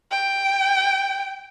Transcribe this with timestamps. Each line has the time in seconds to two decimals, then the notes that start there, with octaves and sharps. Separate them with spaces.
0.11 G5